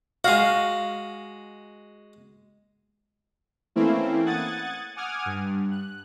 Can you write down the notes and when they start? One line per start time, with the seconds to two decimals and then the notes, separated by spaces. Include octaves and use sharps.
0.24 G#3 F#4 F5
3.76 E3 A3 A#3 C4 C#4 E4
4.26 F#5 D#6 F#6 G#6 A6
4.96 F#5 G#5 D6 D#6 F6 G#6
5.25 G2
5.71 F#6